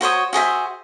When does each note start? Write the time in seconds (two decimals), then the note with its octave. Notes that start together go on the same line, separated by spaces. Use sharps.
0.01 F#4 C5 C#5 D#6
0.33 F#4 G#4 C5 E5